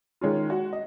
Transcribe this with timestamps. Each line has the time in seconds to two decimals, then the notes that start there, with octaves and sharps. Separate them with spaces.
0.21 D#3 G#3 C#4 F4
0.50 F#4
0.73 D#5